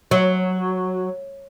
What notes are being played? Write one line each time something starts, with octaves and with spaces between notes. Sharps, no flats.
F#3